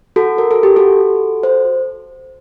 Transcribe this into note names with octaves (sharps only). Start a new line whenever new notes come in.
F#4 A4
A#4
A4
G4
F#4 A4
C5